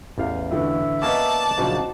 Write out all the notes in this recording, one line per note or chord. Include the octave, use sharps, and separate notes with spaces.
A1 E2 F5
A2 D3 E3 E5
A#3 B3 C#4 B4 D5 D#5 A5 D6
A#1 C#3 F#3 D#4 F#4 C5